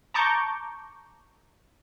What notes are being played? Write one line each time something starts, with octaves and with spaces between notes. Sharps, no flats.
A5 A#5 C#6 D6 G6